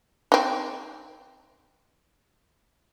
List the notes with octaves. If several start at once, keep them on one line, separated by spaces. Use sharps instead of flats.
C4 D#4